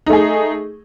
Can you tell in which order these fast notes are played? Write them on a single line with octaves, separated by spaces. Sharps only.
D#4 A3 G#4